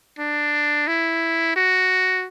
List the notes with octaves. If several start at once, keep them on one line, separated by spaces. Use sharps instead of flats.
D4
E4
F#4